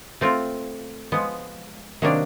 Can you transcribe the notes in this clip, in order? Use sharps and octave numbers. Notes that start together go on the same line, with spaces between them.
A3 C4 F4
F3 G#3 B3
C3 D#3 F#3 A#3 D4